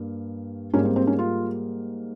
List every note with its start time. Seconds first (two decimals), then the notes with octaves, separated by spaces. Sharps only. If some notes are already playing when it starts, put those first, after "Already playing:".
Already playing: G2 A#3
0.73 G#2 G3 A#3 C#4
0.85 C4
0.96 C4
1.07 C#4
1.19 F4